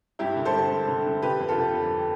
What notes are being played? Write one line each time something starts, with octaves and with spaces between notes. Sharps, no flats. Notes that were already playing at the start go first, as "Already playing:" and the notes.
G2 E4 G4
D3
A4 C5
G2
G2
D3
D3
D3 G4 B4
F2
F4 A4
D3
F2